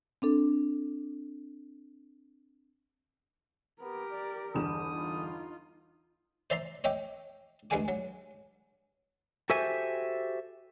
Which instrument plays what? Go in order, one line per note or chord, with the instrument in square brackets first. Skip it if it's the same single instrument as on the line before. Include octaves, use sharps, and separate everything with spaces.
[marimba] C4 D4 A4
[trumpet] B3 [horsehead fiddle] G4 A#4
[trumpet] D5
[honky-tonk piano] G1 E2 E7 [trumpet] D#6
[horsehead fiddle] D#4 F4
[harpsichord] C5 D5 E5 A#5 C6
C#5 D#5 E5 G5 D6
D2 G2 G#3 A3 G#5 D6
F#3
[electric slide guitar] F#4 G4 A4 C5 E5 G#5